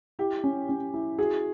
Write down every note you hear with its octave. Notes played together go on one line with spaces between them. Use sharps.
E4 G4
C#4
C#4
E4
F#4 G#4